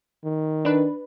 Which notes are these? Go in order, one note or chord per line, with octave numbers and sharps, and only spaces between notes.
D#3
D4 B4